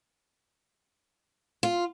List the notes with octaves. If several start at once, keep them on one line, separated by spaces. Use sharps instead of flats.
F4